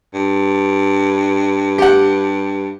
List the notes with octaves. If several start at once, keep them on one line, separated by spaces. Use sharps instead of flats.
G2
G4 F#5